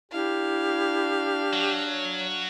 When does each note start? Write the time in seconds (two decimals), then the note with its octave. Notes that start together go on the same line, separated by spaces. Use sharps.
0.12 D4 E4 G4 F5
1.53 F#3
1.83 C#5